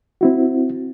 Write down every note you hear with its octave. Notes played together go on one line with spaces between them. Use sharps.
C4 E4 F#4